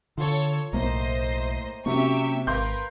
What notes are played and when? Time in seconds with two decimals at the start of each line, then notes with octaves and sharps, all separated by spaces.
0.18 D3 F4 A4 C#5
0.73 B1 A2 A#3 C5 D#5
1.86 C3 F#3 A#3 C#4 G4 E5 C#6
2.47 G#1 A#4 B4 F5 C6 G6